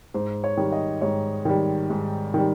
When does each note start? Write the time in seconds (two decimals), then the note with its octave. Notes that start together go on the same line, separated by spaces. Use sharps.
0.14 G#2 C5
0.44 C#5
0.57 D#3 G3
0.72 D#5
1.01 G#2 C#5
1.45 D#3 G3
1.90 G#2
2.34 D#3 G3